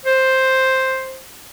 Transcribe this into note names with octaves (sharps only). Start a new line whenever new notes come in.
C5